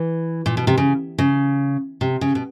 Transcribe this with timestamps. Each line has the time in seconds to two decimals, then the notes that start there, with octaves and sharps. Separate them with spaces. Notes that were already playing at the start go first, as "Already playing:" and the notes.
Already playing: E3
0.46 A#2
0.57 B2
0.67 C3
0.77 C#3
1.18 C#3
2.01 C3
2.21 C#3
2.35 B2